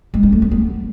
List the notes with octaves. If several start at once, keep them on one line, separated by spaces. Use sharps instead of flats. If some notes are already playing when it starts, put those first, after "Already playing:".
G#3
D4
A3
C4
B3